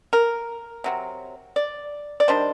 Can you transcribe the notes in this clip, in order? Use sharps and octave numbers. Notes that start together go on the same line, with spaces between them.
A#4
C3 F#3 C4
D5
D5
D#3 G3 D4 C5